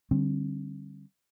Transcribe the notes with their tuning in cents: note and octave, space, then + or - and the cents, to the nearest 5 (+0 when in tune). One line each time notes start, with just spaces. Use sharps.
D3 +0 G3 -10 C4 +35